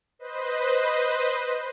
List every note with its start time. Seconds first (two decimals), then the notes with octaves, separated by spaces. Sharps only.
0.19 B4 C5 D#5